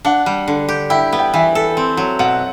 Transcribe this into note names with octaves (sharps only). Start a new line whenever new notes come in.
D4 F#5
G3
D3
G4
E4 G5
B3
G5
E3 E5
A4
C4
F#3
B2 F#5